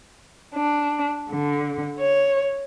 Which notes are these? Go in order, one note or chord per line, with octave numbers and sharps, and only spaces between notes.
D4
D3
C#5